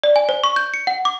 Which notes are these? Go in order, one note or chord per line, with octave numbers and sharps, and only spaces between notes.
D5
G#5
C5
C#6
G6
C#7
F#5
D6